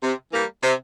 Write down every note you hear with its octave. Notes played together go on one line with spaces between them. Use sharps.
C3
E3 G3 A#3
C3